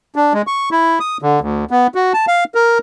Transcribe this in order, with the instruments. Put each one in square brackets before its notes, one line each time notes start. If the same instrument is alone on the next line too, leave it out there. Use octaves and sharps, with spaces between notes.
[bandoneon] D4
G#3
C#6
E4
D#6
D3
D2
B3
F#4
A5
F5
A#4